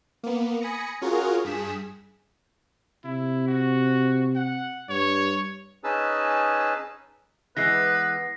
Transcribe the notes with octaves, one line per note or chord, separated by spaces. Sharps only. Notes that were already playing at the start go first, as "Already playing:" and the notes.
A#3 B3
G#5 B5 D#6 A#6 C#7
C#4 F4 F#4 G#4 A#4
G2 G#4 B6 E7
C3 E4
F#4
F#5
G2 C#5
C#4 D#4 G#4 B4 A5 E6
E3 G#3 B3 B4 A#6 C7